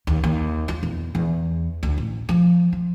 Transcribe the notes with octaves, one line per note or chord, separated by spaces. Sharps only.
D#2
D#2
F4
E2
E2
D2
A1
F3
F3